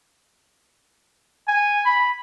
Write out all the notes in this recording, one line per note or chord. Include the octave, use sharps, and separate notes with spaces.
G#5
B5